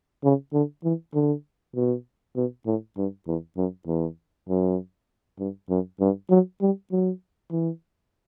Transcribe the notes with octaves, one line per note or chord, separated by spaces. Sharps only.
C#3
D3
E3
D3
B2
B2
A2
G2
E2
F#2
E2
F#2
G2
F#2
G2
F#3
G3
F#3
E3